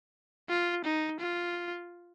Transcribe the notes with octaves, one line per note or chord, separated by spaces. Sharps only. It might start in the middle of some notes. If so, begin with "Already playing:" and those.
F4
D#4
F4